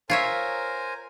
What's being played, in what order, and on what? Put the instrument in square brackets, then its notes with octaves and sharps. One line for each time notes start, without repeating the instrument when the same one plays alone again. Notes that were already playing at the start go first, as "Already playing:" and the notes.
[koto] F4 C#5 E5 [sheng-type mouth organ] A#4 C5 G#5